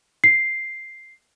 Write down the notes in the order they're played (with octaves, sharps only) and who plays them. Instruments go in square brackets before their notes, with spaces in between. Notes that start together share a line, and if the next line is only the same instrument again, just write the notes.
[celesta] C7